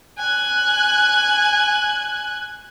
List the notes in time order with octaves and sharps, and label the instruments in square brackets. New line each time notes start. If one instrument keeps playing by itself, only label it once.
[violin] G#5 F#6